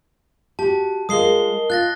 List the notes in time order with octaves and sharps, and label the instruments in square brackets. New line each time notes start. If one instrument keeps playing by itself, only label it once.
[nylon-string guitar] F#4 G4 [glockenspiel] A5
[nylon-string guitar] G#3 F4 G#4 [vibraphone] A#4 D#5 [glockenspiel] D#6 C7 G7
[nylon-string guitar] F4 [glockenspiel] F#6 A6 A#6